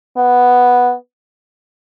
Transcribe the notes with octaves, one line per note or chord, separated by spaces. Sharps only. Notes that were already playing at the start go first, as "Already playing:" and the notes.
B3